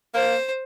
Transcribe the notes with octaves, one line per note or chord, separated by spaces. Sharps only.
A#3 C5